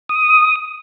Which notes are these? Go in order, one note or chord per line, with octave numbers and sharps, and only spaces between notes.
D#6